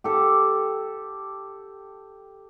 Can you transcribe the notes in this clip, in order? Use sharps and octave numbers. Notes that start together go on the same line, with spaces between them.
G4 A4